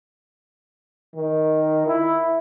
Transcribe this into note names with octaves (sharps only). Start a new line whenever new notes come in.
D#3
E4